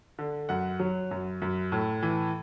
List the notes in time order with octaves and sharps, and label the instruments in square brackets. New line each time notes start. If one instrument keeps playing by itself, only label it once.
[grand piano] D3
F#2 F#5
F#3
F#2
F#2
A2
E3